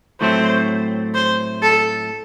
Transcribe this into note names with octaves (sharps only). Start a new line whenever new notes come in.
A2 F#3 A3 C4 C5
C5
A4